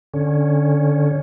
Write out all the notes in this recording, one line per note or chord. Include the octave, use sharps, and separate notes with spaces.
D3 C#4